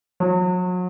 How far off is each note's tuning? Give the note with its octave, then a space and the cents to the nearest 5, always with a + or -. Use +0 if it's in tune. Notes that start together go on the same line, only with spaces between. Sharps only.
F#3 -35